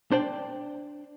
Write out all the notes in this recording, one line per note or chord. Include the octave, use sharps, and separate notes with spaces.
D4 C5 D5 G5